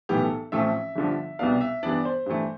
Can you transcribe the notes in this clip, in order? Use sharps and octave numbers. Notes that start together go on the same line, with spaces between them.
B1 A2 E3 B3 G4
A4
A1 A2 F3 A3 C4 E5
G1 G2 D3 F3
C2 B2 B3 D4 F5
E5
G2 E3 B3 D4 D5
C5
G2 E3 A3